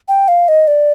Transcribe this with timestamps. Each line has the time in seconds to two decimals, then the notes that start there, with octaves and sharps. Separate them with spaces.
0.08 G5
0.28 F5
0.48 D#5
0.67 D5